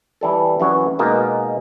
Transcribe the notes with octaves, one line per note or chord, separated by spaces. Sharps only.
E3 G3 A4
F#2 E3 F#4 C#5
B2 G#3 A#3 D#4 A#4